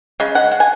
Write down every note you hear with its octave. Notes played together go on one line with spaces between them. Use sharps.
C#3 G#3
F#5
F#5
G#5